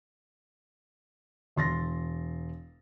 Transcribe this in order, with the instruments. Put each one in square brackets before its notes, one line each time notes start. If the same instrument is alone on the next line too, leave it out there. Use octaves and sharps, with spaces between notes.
[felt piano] E1 C6 A6 A#6